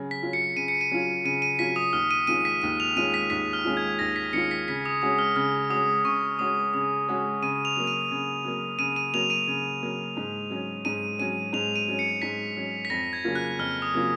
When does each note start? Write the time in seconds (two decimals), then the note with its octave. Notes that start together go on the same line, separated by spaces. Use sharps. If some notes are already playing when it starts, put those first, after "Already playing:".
Already playing: C#3 F#3 C#4
0.11 B6
0.23 F#3 C#4 F4
0.33 C#7
0.56 C#3 D#7
0.68 C#7
0.81 D#7
0.91 F#3 C#4 F4
1.24 C#3 D#7
1.42 D#7
1.59 F#3 C#4 F4 B6
1.76 D#6
1.93 D#2 F6
2.11 D#7
2.27 D#3 G#3 C#4 F4 D#7
2.45 B6
2.62 D#2 D#7
2.80 F7
2.96 D#3 G#3 C#4 F4 D#7
3.14 B6
3.30 D#2 B6
3.53 F6
3.65 D#3 G#3 C#4 F4
3.77 G#6
3.99 D#2 A#6
4.16 B6
4.33 D#3 G#3 C#4 F4 C#7
4.51 B6
4.68 C#3 B6
4.86 D#6
5.02 G#3 C#4 F#4 D#6
5.19 F6
5.36 C#3 F6
5.70 G#3 C#4 F#4 D#6
6.05 C#3 C#6
6.39 G#3 C#4 F#4 D#6
6.74 C#3 D#6
7.08 G#3 C#4 F#4
7.42 C#3 D#7
7.65 F7
7.77 F#3 A#3
7.87 D#7
8.11 C#3
8.44 F#3 A#3
8.79 C#3 D#7
8.96 D#7
9.14 F#3 A#3 F7
9.30 D#7
9.47 C#3
9.82 F#3 A#3
10.17 G#2
10.50 F#3 C#4
10.85 G#2 D#7
11.19 F#3 C#4 D#7
11.53 G#2 F7
11.76 D#7
11.88 F#3 C#4
11.99 C#7
12.22 G#2 B6
12.57 F#3 C#4
12.85 B6
12.90 F2 A#6
13.13 G#6
13.25 C#3 F#3 A#3 F4
13.35 F#6
13.59 F2 F6
13.82 D#6
13.94 C#3 F#3 A#3 F4